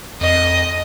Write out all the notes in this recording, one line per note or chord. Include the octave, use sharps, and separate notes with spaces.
F2 D#5